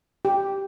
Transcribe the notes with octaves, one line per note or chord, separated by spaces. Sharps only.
G4